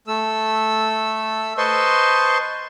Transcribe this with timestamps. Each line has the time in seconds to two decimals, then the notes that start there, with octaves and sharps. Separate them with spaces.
0.07 A3 A4 E6
1.58 B4 C5 D#5 A5 C6 C#6